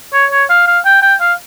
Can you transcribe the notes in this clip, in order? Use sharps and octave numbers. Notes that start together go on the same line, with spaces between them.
C#5
C#5
F5
F5
G5
G5
F5